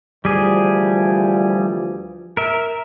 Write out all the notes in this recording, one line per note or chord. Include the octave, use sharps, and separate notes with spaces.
D2 E3 F3 G3 G#4
A#4 E5